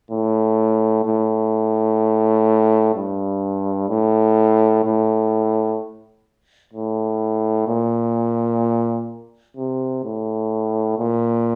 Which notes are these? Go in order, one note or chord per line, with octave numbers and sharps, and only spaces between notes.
A2
A2
G2
A2
A2
A2
A#2
C3
A2
A#2